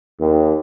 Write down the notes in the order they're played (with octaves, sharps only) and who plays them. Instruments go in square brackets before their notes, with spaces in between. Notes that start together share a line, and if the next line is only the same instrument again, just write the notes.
[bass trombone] D#2